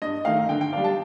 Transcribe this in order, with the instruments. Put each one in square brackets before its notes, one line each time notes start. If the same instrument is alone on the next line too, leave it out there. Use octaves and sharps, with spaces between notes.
[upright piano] G2 D#5
D#3 A3 F5
D3 G5
G5
G3 D4 F5
A5